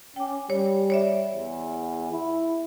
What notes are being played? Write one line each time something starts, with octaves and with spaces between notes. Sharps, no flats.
C#4 G5 D6
G3 C#5
C#5 D5 E5
E2
E4